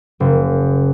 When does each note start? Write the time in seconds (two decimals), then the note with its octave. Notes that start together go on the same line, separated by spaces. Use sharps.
0.20 F#1